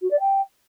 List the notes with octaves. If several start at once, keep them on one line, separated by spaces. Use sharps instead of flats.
F#4
D5
G5